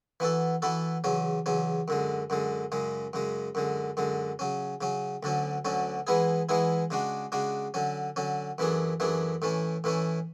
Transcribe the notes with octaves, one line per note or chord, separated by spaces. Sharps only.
E3 B3 F#4 A4
E3 B3 F#4 A4
E2 C#3 F#3 C#4
E2 C#3 F#3 C#4
F#2 D3 G#3
F#2 D3 G#3
F#2 C#3 G#3
F#2 C#3 G#3
F#2 D3 G#3
F#2 D3 G#3
C#3 F#3 C#4
C#3 F#3 C#4
D2 D3 F#3 C#4
D2 D3 F#3 C#4
E3 G#3 B3 E4 G#4
E3 G#3 B3 E4 G#4
C#3 G#3 D4 F#4
C#3 G#3 D4 F#4
D3 F#3 C#4
D3 F#3 C#4
F#2 E3 A3 D4 G#4
F#2 E3 A3 D4 G#4
A2 E3 A3 C#4
A2 E3 A3 C#4